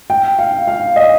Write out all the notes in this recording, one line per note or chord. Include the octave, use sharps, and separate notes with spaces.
G5
F5
F5
D#5